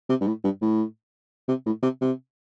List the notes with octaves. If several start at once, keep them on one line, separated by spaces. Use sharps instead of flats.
C3
G2
A2
G2
A2
C3
A2
C3
C3